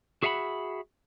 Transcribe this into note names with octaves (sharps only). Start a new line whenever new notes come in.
F#4 G#4 E5 F#5 A5 B5